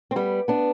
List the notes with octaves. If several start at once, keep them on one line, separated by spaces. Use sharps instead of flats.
C4
G3 B3
B3 D4